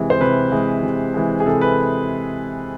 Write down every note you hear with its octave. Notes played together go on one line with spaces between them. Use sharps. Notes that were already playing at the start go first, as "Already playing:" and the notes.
Already playing: C3 E3 G#3
C5
C3 B4
E3 G#3
C3
E3 G#3
G#4
C3 A4
B4